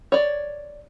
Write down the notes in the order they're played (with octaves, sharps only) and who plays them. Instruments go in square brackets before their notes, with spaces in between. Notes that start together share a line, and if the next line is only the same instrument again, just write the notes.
[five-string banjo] C#5 D5